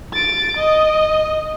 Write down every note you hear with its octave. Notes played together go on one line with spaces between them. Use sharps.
A6 D7
D#5